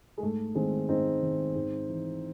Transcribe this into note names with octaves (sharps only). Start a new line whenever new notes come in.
G#3
G#2 A3
D#3 G#3 C4
G#2 C4 D#4
D#3
G#2
E3